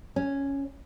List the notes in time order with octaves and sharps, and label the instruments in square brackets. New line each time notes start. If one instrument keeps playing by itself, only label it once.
[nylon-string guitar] C#4